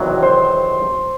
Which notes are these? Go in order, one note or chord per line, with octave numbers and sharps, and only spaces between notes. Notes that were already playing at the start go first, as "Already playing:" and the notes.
Already playing: E2 C3 D#3 F#3
C5 C6